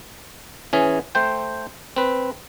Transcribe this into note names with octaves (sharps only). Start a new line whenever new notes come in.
E3 C#4 G#4
A3 C5 G5
C4 B4